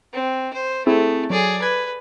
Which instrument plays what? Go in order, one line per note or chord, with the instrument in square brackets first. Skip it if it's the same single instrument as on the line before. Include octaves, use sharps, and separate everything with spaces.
[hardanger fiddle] C4
C5
[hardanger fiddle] A3 [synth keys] C4 E4 G#4
[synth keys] F#3 [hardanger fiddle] G#4 D5
[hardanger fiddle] B4 [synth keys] G#6